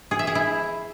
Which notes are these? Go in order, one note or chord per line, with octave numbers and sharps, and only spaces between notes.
G#4
E5
G#4
E4